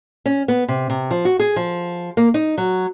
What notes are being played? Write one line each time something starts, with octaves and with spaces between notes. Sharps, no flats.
C#4
B3
C3
C3
F3
F#4
G#4
F3
A#3
D#4
F#3